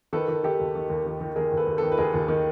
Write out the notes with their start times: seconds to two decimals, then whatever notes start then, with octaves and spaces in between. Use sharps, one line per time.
0.13 D#3 A4 B4
0.28 D#3
0.44 D#3 G4 A4
0.60 D#2
0.75 D#3
0.90 D#2
1.06 D#3
1.21 D#3
1.36 D#3 G#4 A#4
1.52 D#2
1.57 A4 B4
1.67 D#2
1.77 A4 B4
1.83 D#3
1.92 B4
1.98 D#2 G#4 A#4
2.14 D#2
2.28 D#3